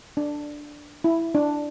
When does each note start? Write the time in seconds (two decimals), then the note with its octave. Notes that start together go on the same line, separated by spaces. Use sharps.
0.17 D4
1.04 E4
1.35 D4